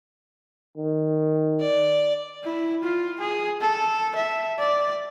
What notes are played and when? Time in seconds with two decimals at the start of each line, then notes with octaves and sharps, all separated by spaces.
0.77 D#3
1.60 D5
2.44 E4
2.83 F4
3.21 G#4
3.61 A4
4.16 E5
4.59 D5